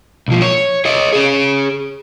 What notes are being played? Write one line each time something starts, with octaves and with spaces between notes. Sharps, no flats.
B1 F3
C#5
C#5 D#5
G#4 C#5